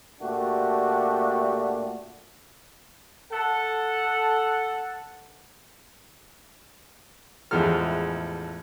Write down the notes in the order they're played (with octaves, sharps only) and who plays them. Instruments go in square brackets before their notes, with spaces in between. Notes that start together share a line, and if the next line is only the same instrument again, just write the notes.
[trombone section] A#2 A3 D4 F#4 G4
[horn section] A4 F#5
[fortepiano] A1 E2 F3 G#3 A4 F6